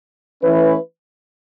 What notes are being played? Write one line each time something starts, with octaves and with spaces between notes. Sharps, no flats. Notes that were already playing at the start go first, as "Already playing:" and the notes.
E3 A3 C#4 E4 B4